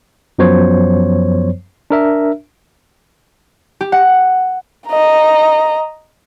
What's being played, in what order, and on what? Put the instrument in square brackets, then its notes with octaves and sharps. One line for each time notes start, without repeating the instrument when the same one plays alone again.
[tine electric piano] F#2 F3 F#3 B3 C5 C#5
D4 A#4 E5
[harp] G4
F#5
[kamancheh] D#5 A#5